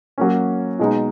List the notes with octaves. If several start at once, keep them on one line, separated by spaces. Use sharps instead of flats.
F#3 A#3 C#4
B2 G#3 D#4